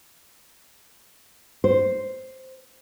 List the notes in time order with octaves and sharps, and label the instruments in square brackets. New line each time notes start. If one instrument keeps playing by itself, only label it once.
[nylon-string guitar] C5